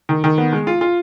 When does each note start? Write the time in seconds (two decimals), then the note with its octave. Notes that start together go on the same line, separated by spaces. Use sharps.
0.09 D#3
0.24 D#3
0.38 B3
0.53 G#3
0.67 F4
0.81 F4